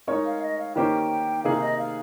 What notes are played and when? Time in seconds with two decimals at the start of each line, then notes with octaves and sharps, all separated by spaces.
0.07 G#3 D#4 A#4 C#5
0.25 F5
0.42 D#5
0.58 F5
0.76 D#3 A#3 C#4 G4 C5 G5
1.43 C3 D#3 A#3 D#4 G#4 F5
1.61 D#5
1.78 F5